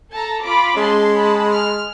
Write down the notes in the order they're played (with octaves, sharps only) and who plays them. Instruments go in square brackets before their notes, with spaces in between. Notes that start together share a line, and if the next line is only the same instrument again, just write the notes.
[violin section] A4 A5 A#5
F4 B5 D6
[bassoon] G#3 [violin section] C#4 A5 C6
[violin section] A5 B5
F6